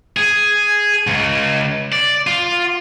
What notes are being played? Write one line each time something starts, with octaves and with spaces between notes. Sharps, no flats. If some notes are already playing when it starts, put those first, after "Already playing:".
G#4
C#2
D5
F4